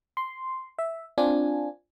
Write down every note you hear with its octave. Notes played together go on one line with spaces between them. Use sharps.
C6
E5
C4 D4 F4 G#5